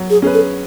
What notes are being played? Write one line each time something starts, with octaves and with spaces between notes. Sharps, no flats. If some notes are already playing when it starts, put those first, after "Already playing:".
Already playing: F#3
G#4
C#4 G#4 B4
A4